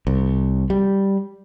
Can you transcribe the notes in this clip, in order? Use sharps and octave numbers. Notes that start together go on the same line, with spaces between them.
C2
G3